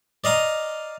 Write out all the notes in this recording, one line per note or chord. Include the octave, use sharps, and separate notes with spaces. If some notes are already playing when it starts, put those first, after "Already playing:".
D5 D#5 F5 A#5